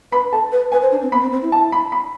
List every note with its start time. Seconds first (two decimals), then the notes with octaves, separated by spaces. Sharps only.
0.12 B4 B5
0.32 A4 A5
0.52 B4
0.72 B4 G#5
0.82 C5
0.92 D4
1.02 C4
1.12 B3 B5
1.22 C4
1.32 C4
1.42 E4
1.52 A5
1.72 B5
1.92 B5